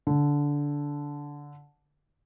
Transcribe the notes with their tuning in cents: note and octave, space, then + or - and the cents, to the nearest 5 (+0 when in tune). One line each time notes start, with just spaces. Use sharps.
D3 -15